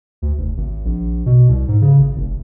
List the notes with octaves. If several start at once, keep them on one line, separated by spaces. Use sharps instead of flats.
D2
F1
G#1
A#1
B2
C2
G#2
C#3
G#1
F1